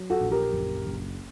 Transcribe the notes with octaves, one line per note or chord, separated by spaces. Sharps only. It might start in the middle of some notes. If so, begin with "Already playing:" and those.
Already playing: F#3
F#4 A4
A#1
G4 A#4
F#1
F#1